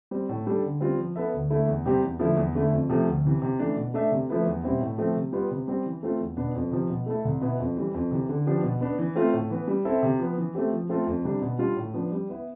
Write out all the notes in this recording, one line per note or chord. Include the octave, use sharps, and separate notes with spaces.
G3 C4
A2
G3 D4 A4
D3
G3 C4 F4
F3
B3 E4 A4 E5
D2
D3 A3 E4
E2
C3 G3 C4 G4
E2
D3 F3 A3 E4
E2
D3 A3 E4
F2
C3 F3 A3
D2
C3 E3
C3
E3 A3 D4
B2
A3 D4 A4 E5
C3
F3 A3 E4 B4
E2
B2 G3 C4 E4
A2
F3 A3 C4
C3
G3 B3 F4
C3
G3 C4 G4
E3
A3 C4 F4
E2
B2 B3 D4
F2
C3 F3
B2
A3 E4 A4
C2
B2 B3 E4
F2
E3 G3
F2
C3 E3
D3
F3 B3 D4 G4
B2
B3 D4
E3
A3 C4 F4 C5
A2
E3 B3
G3
C4 E4 A4 E5
C3
F3 B3
E3
A3 C4 G4
F3
A3 C4 F4 A4
F2
C3 G3 D4
B2
G3 D4 F4
A2
F3 B3 D4
G3
B3 E4